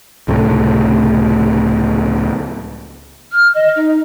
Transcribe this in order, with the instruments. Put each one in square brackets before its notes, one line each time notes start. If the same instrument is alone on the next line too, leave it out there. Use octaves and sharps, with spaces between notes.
[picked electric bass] C#2 A2 C3 A3
[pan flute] F6
D#5
D#4